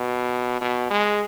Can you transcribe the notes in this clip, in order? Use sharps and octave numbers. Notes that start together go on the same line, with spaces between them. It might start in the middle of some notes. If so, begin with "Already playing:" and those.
Already playing: B2
B2
G#3